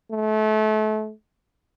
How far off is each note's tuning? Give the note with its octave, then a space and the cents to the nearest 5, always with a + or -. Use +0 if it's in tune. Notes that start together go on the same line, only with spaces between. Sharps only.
A3 -30